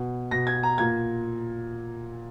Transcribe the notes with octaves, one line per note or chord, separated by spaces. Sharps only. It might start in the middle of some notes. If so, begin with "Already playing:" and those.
Already playing: B2
B2 A#6
G#6
A#5
A#2 G#6